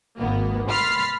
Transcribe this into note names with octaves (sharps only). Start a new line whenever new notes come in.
G#1 A#3 B3
B5 C6 F6 A6 B6 C7